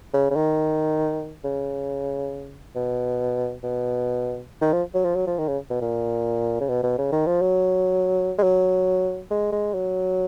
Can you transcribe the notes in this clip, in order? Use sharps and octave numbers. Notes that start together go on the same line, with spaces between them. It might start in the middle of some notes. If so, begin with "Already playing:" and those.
C#3
C#3
D#3
C#3
B2
B2
D#3
F3
F#3
F3
F#3
F3
D#3
C#3
B2
A#2
C#3
B2
B2
C#3
D#3
F3
F#3
G#3
F#3
G#3
G#3
F#3